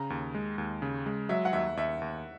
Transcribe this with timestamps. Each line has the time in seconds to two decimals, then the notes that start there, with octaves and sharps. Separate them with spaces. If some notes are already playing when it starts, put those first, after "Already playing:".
Already playing: C#3 A#5
0.10 D#2
0.35 G#3
0.58 D#2
0.82 C#3
1.06 G#3
1.29 F#3 E5
1.45 F#5
1.53 D#2 E5
1.77 D#2 E5
2.01 D#2